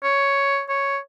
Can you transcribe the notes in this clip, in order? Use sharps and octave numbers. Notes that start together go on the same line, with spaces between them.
C#5
C#5